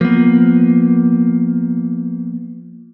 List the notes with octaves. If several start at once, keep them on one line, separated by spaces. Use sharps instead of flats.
F3 A#3 B3